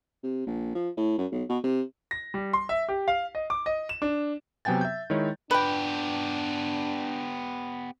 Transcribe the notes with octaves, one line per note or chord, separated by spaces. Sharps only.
C3
A#1
F3
A2
F#2
B1
B2
C3
A#6
G3
C6
E5
G4
F5
D#5
D6
D#5
E7
D4
C3 F#3 B3 G5 G#5 A6
E5 G6
D#3 G#3 E4 C#5
B3 D4 G4 B4 G5